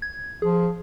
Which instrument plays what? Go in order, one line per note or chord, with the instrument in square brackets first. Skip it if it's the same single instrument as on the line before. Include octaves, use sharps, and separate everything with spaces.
[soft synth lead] G#6
[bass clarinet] F3 [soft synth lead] G#4